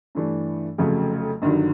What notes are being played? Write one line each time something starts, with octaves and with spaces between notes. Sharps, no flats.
G2 E3 A3 D4
F1 F2 C#3 F#3 A3
G1 G2 D#3 F#3